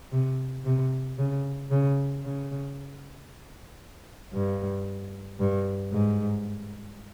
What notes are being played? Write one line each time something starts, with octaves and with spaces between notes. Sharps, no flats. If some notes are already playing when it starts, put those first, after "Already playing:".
C3
C3
C#3
C#3
C#3
G2
G2
G#2